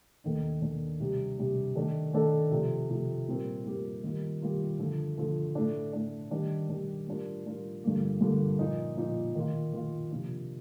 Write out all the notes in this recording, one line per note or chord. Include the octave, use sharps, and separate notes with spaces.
D#2 D#3 A3 D4
D#2 D#3 A3 D4
C3 G3 D4 G4
C3 G3 D4 G4
D#3 A3 D4 A4
D#3 A3 D4 A4
C3 F3 A3
C3 F3 A3
A#2 G3 C4 G4 A#4
A#2 G3 C4 G4 A#4
D#3 G3 A#3 F4 A#4
D#3 G3 A#3 F4 A#4
D3 F3 A3
D3 F3 A3
A2 A3 D4
A2 A3 D4
D#3 G3 D4
D#3 G3 D4
A2 G3 D4 F4 A#4
A2 G3 D4 F4 A#4
G2 D3 F3 A#3
G2 D3 F3 A#3
A#2 F3 A#3 D#4
A#2 F3 A#3 D#4
D#3 A#3 F4
D#3 A#3 F4
C3 F3 A#3 D4